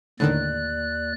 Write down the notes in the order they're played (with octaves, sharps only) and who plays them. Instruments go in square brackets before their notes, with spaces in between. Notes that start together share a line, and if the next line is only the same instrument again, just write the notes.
[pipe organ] D#2 D5 F#6 [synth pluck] A2 D3 D#3